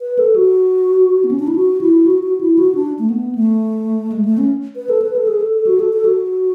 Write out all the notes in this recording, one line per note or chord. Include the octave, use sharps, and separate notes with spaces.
B4
A4
F#4
B3
C#4
D4
E4
F#4
E4
F#4
F#4
E4
F#4
D4
A3
B3
A3
G#3
A3
C#4
B4
A4
B4
A4
G#4
A4
A4
F#4
A4
A4
F#4